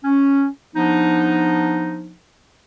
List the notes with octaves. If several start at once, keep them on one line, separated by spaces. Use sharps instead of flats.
C#4
F3 B3 D4 D#4